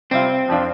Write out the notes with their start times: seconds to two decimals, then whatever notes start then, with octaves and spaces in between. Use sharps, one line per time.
0.11 C3 G3 C4 F4
0.48 F2 F3 D4 F4